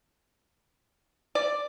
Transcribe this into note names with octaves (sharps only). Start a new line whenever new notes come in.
D5